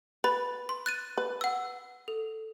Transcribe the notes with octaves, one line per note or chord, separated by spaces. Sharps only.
B4 B5 A6
C6
F#6 A6 D#7
B4
F#5 E6
A4